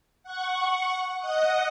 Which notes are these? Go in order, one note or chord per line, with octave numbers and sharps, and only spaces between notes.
F#5 C#6
D#5 F#5 D#6